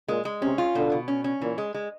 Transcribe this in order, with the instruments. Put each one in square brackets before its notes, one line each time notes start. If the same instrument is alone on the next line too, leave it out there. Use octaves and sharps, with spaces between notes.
[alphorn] A#2 [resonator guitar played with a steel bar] G#3
[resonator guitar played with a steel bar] G#3
[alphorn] C3 [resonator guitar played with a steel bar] C#4
[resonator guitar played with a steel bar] F4
[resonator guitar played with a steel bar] B2 [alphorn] D3
[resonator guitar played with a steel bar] B2
C#4
C#4
[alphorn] A#2 [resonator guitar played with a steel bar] E3
[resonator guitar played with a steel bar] G#3
G#3